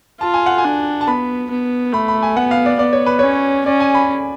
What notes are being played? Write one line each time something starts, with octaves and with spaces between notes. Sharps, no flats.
F4 A5
G#5
F#5
G#5
D4
A5
B3 B5
B3
A3 B5
B5
G#5
B3 F#5
F5
D5
B3 D5
C#5
B4
C#4 C#5
C#4 D5
G#5
B5